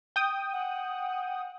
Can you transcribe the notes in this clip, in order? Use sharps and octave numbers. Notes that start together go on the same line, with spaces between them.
G5 D#6
F#5